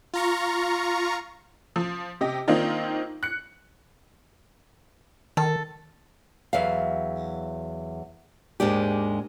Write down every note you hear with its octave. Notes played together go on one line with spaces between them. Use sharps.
F4 A#5 C#6
F3
C3 G4 D#5
D#3 A#3 C4 D4 D#4 F4
F#6 C#7
D#3 A4
E2 F#3 E5 F5
D#2 G#2 D#3 G#3 D4 G4